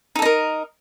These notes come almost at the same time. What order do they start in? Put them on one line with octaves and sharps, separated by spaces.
D#4 A4 D#5 A#4